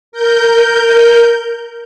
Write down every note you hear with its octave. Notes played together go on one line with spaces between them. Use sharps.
A#4 G6